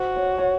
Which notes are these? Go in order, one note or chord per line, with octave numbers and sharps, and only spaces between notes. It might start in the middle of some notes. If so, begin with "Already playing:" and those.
Already playing: F#4 C5
C#5
C#5